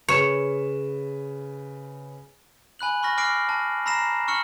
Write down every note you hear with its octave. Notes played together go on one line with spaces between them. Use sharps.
C#3 B4 C#5 E7
G#5 B5 F#6 F#7
B5 C#6 F6 A#6
D6 F6 A#6 C7 D7
A5
A#5 B5 E6 A#6 C7 E7
C#6 E6 F6 C#7 F#7